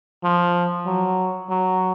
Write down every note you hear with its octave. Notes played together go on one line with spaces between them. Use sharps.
F3
F#3
F#3